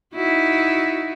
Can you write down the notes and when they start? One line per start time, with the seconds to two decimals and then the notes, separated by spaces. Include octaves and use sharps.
0.14 D#4 E4 F#4